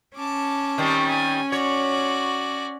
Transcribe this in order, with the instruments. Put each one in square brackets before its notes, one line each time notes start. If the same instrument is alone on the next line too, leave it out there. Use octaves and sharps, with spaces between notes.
[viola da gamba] C#4 [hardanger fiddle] A5 D6
[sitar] D#3 G3 C4
[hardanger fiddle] G#5
[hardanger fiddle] F#4 D5 [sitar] C#5